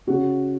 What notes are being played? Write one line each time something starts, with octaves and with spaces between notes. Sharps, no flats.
C#3 F#4